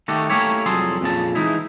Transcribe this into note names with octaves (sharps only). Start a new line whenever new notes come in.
D#3 A3 F#4 G4 A4
A3 A#3 C#4 E4 G4 C#5
C2 F2 F#3 G#4 A4 C6
F2 A#2 C#3 A5
E3 G#3 D#4 E4